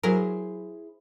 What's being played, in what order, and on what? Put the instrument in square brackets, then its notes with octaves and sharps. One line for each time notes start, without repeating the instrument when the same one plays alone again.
[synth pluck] F#3 A#4 [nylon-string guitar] E4 G#4 C5